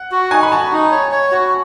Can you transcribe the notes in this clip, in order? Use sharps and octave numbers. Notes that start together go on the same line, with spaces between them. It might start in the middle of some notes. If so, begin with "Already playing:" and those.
Already playing: F#5
F#4
D#4 G#5
B5
F#4 A5
D#4
C#5
C#5
F#4